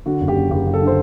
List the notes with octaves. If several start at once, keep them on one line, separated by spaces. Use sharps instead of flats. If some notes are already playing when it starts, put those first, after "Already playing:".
D3 F#4
F#1
G4
F#1
F#1 G4
F#1
A4
D3
C5